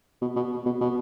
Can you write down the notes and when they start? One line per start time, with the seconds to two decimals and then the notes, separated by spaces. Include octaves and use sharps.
0.21 B2
0.36 B2
0.66 B2
0.81 B2